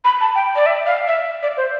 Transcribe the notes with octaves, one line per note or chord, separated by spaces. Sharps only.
B5
A5
G5
D5
E5
F5
E5
D5
C5